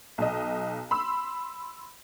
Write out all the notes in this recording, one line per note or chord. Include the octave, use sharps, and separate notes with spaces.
B1 D#5
B5 C6 E6